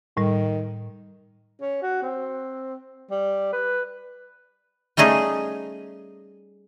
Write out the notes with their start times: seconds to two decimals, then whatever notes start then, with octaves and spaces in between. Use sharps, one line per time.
0.17 A2 D#3 G3
1.62 C#4
1.83 F#4
2.03 C4
3.11 G3
3.53 B4
4.97 G3 A3 C#4 D#4 G#4